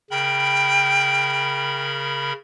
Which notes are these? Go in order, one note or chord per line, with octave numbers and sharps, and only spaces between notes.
C#3 A#4 G5 B5